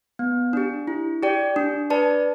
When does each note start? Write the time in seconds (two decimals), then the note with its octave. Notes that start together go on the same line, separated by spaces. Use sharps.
0.19 B3
0.53 D4 G4
0.87 E4
1.23 G4 D5 G5
1.56 D4
1.90 B4 D5 A5